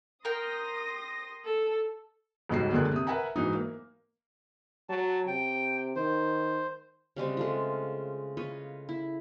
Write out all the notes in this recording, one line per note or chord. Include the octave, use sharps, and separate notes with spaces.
A#4 G5 C6 D#6 A#6
A4
D#1 C#2 G#2 F#4 D#5 C7
C#2 D3 G#4 A#4 F#6
C3 D#6
A#4 B4 E5 F#5 G#5 A#5
G#2 E3 F#3 D#4
A#3
F#3 A5
C3 G5
D#3 C5
C#3 G3 G#3 C4
G#3 A3 F4
F4 B4 C#5 D#5
E4